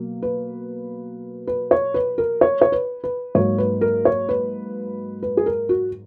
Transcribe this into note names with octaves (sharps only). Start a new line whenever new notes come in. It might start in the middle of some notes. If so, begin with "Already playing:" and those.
Already playing: B2 F#3 A#3
B4
B4
C#5
B4
A#4
C#5
C#5
B4
B4
G#2 F#3 A#3 C#5
B4
A#4
C#5
B4
B4
G#4
A#4
F#4